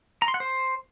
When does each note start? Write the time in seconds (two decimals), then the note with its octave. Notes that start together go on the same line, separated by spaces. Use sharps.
0.22 A#5
0.28 C6
0.34 F#5
0.40 C5